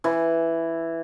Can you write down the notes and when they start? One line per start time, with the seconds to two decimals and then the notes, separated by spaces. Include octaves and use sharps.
0.04 E3